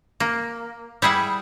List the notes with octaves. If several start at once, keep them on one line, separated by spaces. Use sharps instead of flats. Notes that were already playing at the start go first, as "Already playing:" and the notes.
A#3
G3 E4 G#4 F#5